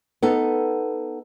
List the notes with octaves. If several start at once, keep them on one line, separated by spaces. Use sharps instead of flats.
B3 D#4 A4